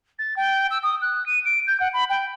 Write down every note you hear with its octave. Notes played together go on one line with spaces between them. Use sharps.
A6
G5
E6
D#6
F#6
D#7
D7
G6
F#5
B5
G5